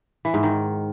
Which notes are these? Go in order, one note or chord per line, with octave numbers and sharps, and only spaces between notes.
E3
G#2
D#3